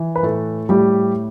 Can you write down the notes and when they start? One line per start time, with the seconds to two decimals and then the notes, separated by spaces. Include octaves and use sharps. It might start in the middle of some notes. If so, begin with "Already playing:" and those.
Already playing: E3
0.16 B4
0.23 A2 A3 A4
0.69 A2 G3 G4